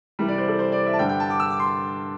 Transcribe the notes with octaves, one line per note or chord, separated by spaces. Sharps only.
C2 C3 E3 G3
D5
C5
A4
C5
D5
E5
A5
G2 D3 G3 G5
G5
A5
D6
E6
D6
C6